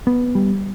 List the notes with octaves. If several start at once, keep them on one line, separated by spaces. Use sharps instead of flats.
B3
G3